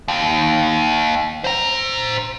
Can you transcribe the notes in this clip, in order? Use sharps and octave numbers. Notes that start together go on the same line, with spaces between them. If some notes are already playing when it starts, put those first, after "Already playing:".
D#2
C5 A#5